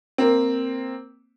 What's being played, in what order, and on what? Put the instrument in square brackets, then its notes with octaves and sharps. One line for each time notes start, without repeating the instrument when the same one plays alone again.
[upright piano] A#3 C4